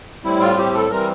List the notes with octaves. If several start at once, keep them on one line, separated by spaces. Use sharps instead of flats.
A2 G3 C4 E4
F4
G4
A4
E3 G3 C4 A#4